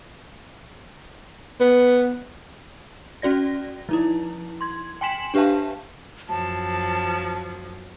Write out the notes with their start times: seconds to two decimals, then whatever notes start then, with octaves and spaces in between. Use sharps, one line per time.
1.61 B3
3.22 C#4 F#4 D5 A#6
3.89 F3 D#4 E4
4.61 C6 G#6
5.01 G5 G#5 C6 B6 E7 F#7
5.34 D4 G4 B4 E5 F5 A5
6.29 F#2 F3 F#3 A5